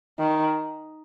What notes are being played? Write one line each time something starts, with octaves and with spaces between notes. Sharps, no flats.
D#3